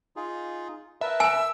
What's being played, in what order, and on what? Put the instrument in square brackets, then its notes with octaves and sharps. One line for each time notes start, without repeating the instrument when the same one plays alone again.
[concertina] D#4 F4 G#4
[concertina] A#4 B4 A5 [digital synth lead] E5
[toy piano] G#5 [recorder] E6